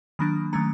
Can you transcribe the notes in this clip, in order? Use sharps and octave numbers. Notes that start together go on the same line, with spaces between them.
D#3 F#3 A#3 D4 B5
D#3 F#3 A3 C#4 A#5